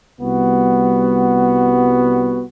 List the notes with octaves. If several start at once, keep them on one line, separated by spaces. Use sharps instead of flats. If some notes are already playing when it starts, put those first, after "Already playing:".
C2 G3 B3 F#4